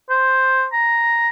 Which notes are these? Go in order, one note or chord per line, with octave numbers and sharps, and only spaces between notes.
C5
A#5